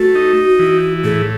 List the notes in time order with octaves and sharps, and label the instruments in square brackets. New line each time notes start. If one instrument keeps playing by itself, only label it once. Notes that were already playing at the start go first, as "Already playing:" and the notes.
Already playing: [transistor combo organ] A3 [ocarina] F#4
[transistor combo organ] D#4
E3
[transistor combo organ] A2 [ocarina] G#4